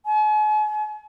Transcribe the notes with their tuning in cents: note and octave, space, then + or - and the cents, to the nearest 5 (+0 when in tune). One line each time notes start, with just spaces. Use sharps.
G#5 +40